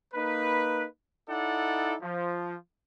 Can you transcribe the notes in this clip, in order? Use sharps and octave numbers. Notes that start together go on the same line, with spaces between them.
A#3 D#4 B4
D#4 E4 A4 D5 F#5
F3